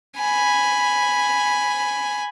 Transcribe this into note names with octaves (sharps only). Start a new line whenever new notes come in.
G#5 B5